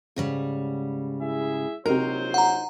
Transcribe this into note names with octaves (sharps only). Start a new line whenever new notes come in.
G#2 C#3 G3
E4 G#4 E5
A#1 C3 F#3 D#4 A#4 C5
F#5 A#5